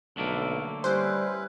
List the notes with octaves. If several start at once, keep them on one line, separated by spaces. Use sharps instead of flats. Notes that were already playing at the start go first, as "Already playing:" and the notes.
B1 D3 A3 A#3
G3 C#4 E4 B4 C5